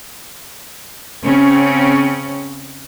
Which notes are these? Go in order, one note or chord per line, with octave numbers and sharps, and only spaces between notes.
C#3 C4 C#4